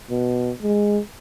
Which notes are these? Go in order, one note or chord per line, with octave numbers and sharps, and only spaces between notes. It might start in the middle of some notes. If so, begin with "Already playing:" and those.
B2
G#3